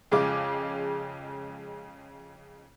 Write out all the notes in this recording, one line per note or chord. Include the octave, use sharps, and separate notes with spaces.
F2 C#3 G#3 F4 D6